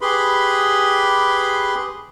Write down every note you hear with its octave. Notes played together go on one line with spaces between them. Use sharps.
G4 G#4 B4 B5 C6